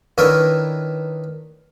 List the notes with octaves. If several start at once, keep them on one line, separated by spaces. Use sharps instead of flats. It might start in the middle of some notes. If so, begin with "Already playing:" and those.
D#3 D4 E4 A#4 B4 C#5